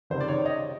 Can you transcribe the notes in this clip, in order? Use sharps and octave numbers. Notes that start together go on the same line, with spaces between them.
C#2 C3 D#3 C5
D5
C#5
D#5